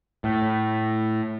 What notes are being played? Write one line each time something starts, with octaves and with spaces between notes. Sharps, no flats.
A2